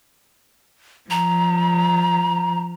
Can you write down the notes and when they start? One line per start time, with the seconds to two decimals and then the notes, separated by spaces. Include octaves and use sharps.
1.11 F3 A#5